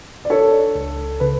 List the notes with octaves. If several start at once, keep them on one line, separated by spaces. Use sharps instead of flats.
D5
D4 A4 C#5
C#2
C#3 B4